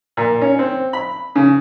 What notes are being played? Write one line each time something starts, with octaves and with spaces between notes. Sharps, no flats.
A#2
C#4
C4
B5
C#3